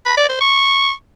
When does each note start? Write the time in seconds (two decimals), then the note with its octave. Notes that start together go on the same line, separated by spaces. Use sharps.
0.05 B5
0.17 D5
0.29 C5
0.41 C#6